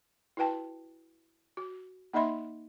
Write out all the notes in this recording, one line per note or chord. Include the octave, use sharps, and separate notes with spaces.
E4 F#4 B4 G5 A5
F#4
A#3 D#4 D#5 E5 B5 C6